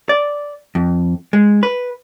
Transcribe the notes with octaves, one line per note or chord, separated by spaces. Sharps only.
D5
F2
G#3
B4